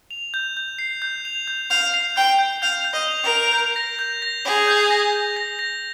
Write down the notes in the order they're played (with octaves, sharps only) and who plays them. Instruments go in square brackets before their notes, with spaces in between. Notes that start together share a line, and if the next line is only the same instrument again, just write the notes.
[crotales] F7
G6
G6
C7
G6
F7
G6
[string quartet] F5 [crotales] G6
[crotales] C7
[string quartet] G5 [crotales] G6
[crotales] G6
[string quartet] F5 [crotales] G6
[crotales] G6
[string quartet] D#5
[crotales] F7
[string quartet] A#4
[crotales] F7
G6
A#6
G6
A#6
[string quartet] G#4 [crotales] F7
[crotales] G6
A#6
G6
A#6
A#6